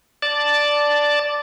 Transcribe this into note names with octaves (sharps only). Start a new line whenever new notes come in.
D5 A5